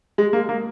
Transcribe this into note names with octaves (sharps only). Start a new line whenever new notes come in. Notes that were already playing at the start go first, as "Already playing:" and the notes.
G#3
A#3
A#3